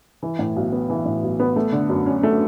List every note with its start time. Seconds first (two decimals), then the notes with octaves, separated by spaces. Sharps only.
0.23 E3
0.39 A2
0.56 B1
0.72 B3
0.90 E3
1.05 A2
1.23 B1
1.40 B3
1.56 A3
1.72 D3
1.89 F#2
2.06 C#4
2.23 A3